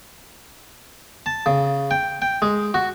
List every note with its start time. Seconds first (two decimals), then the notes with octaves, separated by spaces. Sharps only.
1.26 A5
1.46 C#3
1.91 G5
2.22 G5
2.42 G#3
2.74 F#4